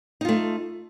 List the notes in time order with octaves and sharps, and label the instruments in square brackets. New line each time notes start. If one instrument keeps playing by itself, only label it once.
[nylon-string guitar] D#4
F4
A3